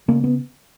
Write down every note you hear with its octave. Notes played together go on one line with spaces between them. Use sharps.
C#3 A#3
B3